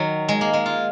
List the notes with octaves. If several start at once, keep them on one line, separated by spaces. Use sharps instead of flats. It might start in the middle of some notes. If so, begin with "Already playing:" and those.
Already playing: D#3 F#3
G#3
A#3
G#3
F4